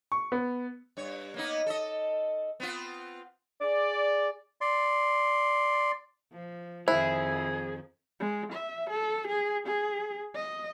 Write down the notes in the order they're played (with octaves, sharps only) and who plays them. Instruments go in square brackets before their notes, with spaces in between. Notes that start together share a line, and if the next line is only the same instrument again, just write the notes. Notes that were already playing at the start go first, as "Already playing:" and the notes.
[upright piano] C#6
B3
[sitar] G2 C#5
A#3 B3 D#4
A4 D#5
B3 C4 F4
[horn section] G#4 D5
[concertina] D5 C6
[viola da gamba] F3
[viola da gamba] F2 D#3 F3 [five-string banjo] E4 [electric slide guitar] G#4 [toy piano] C5
[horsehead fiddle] G#3
E5
A4
G#4
G#4
D#5